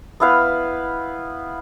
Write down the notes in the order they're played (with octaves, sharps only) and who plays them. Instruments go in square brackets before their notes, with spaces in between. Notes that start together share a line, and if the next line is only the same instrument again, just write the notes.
[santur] B3 E4 B4 F5